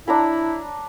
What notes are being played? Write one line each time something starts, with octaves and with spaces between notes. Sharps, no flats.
D4 E4 A#5 B5